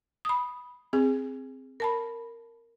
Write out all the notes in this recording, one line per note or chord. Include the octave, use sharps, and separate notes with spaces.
B5 D#6
C4 G#4
A#4 A5 B5